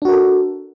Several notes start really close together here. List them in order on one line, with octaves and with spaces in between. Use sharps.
D4 F#4 A#4 A4